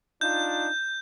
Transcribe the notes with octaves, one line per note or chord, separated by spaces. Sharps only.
D4 D#4 F4 G6